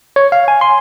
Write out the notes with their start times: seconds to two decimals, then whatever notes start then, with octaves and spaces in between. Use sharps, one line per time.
0.16 C#5
0.32 F5
0.48 G#5
0.61 C6